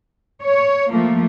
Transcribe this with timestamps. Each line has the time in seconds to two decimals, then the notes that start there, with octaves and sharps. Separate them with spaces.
0.42 C#5
0.90 F3 A3 A#3